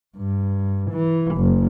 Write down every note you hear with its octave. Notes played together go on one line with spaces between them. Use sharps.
G2
E3
F#1